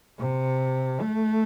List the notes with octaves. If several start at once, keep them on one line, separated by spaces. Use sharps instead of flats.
C3
A3